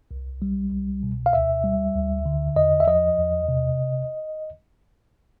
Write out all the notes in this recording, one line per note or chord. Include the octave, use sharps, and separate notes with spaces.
C2
G3
C2
B2
F5
D2 E5
G3
D2
D3
E2 D#5
E5
F3 D#5
E2
C3